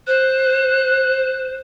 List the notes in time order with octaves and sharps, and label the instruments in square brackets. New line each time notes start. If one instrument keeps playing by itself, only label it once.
[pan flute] C5 [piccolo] F#6